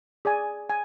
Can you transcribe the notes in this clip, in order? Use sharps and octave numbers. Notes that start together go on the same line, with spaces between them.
G#4 D5 G#5
G#5